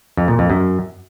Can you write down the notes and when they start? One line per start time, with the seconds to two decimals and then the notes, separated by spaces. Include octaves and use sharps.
0.17 F2
0.28 A#2
0.39 F2
0.50 F#2